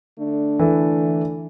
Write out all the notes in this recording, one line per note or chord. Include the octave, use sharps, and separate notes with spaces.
D3 A3 D4
E3 A4